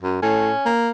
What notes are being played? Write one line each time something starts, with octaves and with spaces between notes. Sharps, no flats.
F#2
A2 C#4
A#3